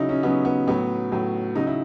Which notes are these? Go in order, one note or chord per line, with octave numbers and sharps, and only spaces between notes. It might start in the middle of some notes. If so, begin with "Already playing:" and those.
Already playing: C#3 F#3 D#4 E4
C#4
C#3 F#3 B3
B3
A2 F#3 B3
A2 F#3
C#3 F#3 D#4
E4